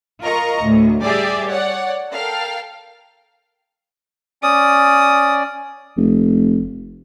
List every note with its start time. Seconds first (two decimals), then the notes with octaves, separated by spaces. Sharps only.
0.23 F4 A#4 D#5 A#5 C#6
0.62 D2 A2
1.02 G3 G4 G#4 D5 E5
1.47 C#5 D5 F#5
2.09 A4 A#4 F5 G5
4.43 C#4 D5 D#6
5.97 F1